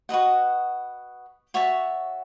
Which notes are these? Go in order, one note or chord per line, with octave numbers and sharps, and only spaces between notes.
F#4 B4 D#5 F#5
F#4 C#5 E5 A5